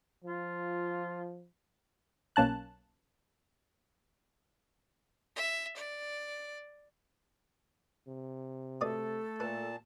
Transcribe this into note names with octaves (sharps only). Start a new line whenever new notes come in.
F3 F4
B1 A#3 C#4 A5 F#6
E5
D5
C3
B2 A3 A4 D5 D#6
A#2 B4 A5